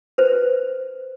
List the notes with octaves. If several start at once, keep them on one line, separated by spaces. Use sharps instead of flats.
B4 C5